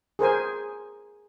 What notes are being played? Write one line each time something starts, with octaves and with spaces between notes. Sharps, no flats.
G#4 A#4 C5 G#5